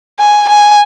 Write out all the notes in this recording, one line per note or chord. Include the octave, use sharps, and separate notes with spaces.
G#5
G#5